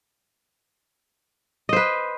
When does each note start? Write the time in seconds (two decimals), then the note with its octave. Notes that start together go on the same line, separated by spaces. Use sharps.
1.69 D#5
1.73 C5
1.76 B4